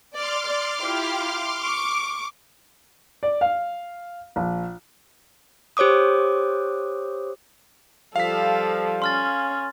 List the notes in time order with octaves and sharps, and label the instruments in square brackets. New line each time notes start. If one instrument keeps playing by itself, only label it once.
[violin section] D5 [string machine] C6 D6 F6
[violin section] D5
E4 F4 G4
C#6 D6
[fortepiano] D5
F5
A#1
[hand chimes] G4 C5 C#5 D6 D#6
[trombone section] F3 G3 [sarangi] A4 [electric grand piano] F5 B6
[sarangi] C#4 [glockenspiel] C6 F6 A6